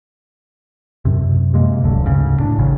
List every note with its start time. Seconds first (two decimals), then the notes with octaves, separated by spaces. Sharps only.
1.05 F#2 C3
1.54 C3 G#3 A#3
1.82 D1 C2 F#2 D3
2.02 G#1 D2 C#3
2.40 A2 D4
2.59 A1 C#3